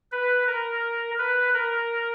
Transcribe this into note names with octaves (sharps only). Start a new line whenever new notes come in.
B4
A#4
B4
A#4